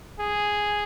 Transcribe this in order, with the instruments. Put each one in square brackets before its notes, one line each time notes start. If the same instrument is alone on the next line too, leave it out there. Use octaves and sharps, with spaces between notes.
[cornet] G#4